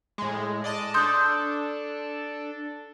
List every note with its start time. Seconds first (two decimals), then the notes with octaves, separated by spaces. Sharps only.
0.18 A2 G#3
0.64 D5 D#5 A5
0.94 D4 A4 C6 D#6 G6